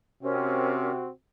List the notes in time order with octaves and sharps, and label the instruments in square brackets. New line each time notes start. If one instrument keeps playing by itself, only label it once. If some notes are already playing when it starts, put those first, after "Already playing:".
[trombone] C3 [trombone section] C4 F#4 [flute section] C#4 A#4